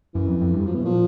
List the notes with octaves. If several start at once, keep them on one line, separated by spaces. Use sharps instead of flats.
F#2 E3
F2
F2
G2
F#2 F3
B2 E3
A#2 F3